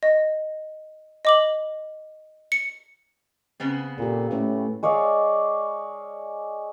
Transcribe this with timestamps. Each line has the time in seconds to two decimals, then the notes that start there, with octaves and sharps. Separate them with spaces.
0.03 D#5
1.25 D#5 D6 F#7
2.52 C#7
3.60 C#3 B3 C4
3.98 A#2 G4 A4
4.31 A2 A3 C#4 B4
4.83 G#3 C#5 D5 F5